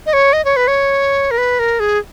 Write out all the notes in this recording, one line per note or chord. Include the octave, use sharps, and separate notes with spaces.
D#5
C#5
D#5
C#5
B4
C#5
A#4
B4
A#4
G#4